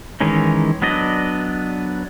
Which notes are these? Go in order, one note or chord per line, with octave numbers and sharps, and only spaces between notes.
D#3 E3 G#3 C#4 D#4
F#3 B3 D4 D5 D#5